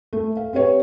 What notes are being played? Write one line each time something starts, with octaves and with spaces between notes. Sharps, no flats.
A3
F5
C4 G4 B4 C#5